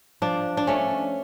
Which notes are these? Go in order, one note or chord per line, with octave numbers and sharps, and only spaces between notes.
F3 D4
D4
A3 C#4